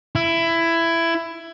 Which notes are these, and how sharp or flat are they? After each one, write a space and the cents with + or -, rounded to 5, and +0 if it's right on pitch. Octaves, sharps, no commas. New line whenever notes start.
E4 +15